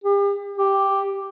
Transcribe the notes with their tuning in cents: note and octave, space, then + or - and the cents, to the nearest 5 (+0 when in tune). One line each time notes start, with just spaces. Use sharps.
G4 +40
G4 +0